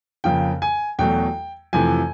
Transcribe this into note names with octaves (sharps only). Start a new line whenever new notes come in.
F2 C#3 F3 A#3 G5
G#5
E2 B2 F#3 A3 G5
F2 C3 E3 A3 G#5